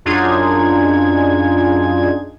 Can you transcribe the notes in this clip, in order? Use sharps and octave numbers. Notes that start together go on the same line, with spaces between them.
F#2 D4 D#4 F4 G#4 G#6